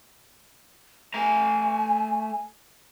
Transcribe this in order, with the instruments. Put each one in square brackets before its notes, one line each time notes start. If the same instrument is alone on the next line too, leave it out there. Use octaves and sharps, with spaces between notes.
[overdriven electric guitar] A3 A#5 [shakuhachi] G#5